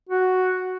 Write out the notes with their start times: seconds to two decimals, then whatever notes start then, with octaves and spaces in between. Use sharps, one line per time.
0.09 F#4